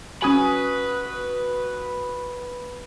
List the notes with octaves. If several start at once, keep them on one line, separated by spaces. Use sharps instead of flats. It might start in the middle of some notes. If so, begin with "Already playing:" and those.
C#4 F#4 B4 G#5 D#6